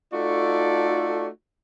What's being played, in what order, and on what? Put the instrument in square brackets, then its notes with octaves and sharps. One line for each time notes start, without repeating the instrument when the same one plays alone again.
[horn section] A3 D#4 F4 F#4 A4 D5